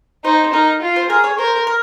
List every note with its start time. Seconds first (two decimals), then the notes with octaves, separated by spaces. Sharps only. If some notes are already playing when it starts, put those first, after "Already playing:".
0.24 D#4 C5
0.52 D#4 A#4
0.81 F4
0.96 C5
1.09 G#4 A#4
1.24 C#5
1.38 A#4 C5
1.67 A#4